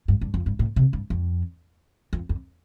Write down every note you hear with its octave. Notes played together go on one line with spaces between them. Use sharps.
G2
G2
F2
G2
A2
C3
G2
F2
F2
F2